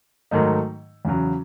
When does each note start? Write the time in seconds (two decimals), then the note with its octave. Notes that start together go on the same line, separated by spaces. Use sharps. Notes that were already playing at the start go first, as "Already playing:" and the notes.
0.31 G#2 D#3 F#3 A3 D#4
1.05 E2 C#3 F#3